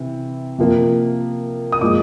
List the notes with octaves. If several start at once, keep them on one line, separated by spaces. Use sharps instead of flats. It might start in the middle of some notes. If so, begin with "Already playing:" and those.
Already playing: C3 E3
C3 F3 A#3
D#6
A#2 F3 G#3 D6